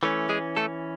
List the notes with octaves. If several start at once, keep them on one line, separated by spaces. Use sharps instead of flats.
E3 A3 C#4
G#3 G#4
A3 A4